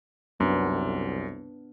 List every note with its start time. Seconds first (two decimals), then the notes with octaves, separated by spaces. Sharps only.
0.40 C2 F#2 B3 D4